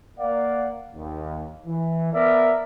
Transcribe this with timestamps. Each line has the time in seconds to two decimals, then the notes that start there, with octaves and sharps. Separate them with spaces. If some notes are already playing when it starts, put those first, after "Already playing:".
0.19 A#3 D5 F5 F#5
0.95 D#2
1.67 E3
2.13 B3 A#4 D5 E5